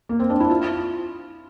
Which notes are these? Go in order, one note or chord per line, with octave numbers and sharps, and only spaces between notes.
A#3
C4
D4
E4
F4